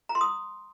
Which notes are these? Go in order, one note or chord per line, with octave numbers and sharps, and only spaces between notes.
A#5
C6
D#6